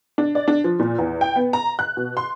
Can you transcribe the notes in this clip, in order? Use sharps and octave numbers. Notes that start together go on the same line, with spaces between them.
D4
D5
D4
F3
A#2
E2
G5
B3
A#5
F#6
B2
C6